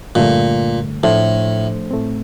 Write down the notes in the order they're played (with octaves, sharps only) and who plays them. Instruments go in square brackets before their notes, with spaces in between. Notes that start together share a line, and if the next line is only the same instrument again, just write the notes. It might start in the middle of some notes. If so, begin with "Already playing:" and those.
[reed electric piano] G2 D3 A3 [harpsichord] A#2
[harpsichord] A2 [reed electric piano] F3 A3 D4 A4 C5
[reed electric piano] A2 A3 C4